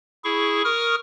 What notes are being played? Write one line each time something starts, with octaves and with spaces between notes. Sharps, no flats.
E4 G#4 C#6
A#4 C#6 D#6 F6